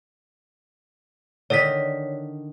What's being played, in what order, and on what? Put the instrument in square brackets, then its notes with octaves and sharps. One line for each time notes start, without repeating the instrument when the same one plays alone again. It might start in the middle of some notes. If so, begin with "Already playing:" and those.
[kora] D3 D#3 D#5 [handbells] C#5 B6